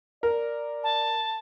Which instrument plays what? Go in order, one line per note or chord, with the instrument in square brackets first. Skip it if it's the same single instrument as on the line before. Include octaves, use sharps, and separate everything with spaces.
[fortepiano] A#4 [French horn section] D5
[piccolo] A5